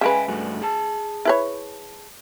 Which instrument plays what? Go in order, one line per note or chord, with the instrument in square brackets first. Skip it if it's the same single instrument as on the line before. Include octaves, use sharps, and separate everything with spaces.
[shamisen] C#3 G#3 B4 [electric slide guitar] E5 G5 G#5
[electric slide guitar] G2 A3 F#4
G#4 A5
[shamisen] E4 B4 C#5